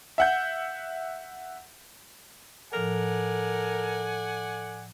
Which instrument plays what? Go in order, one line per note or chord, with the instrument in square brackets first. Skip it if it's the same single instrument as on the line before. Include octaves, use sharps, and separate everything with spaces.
[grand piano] E5 F#5 G6
[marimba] A2 F3 F6 [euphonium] A4 [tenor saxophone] A#4 [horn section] D5 F#5 G#5